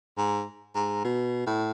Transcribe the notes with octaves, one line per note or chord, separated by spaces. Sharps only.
G#2
G#2
B2
A2